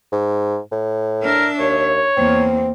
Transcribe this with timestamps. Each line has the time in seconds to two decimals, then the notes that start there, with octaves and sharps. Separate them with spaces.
0.12 G#2
0.72 A2
1.22 D4 A#4 E5
1.59 D#2 C#5
2.17 E2 A#3 C4